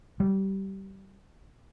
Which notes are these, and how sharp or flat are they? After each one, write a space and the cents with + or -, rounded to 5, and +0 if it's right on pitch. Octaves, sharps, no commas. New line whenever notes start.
G3 -20